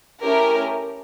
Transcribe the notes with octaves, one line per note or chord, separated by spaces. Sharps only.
A3 C#4 E4 G4 A#4